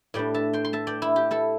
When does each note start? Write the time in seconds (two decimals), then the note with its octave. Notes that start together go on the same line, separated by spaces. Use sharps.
0.14 A2 G3 D4 D5 G5
0.34 E5 A5
0.53 G5 C6
0.65 C6
0.73 E5 A5
0.87 D5 G5
1.02 E4
1.16 G4
1.31 E4 A4